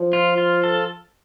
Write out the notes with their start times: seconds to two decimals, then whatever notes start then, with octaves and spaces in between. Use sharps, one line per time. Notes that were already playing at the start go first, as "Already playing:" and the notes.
Already playing: F3
0.13 F4
0.38 F4
0.63 A4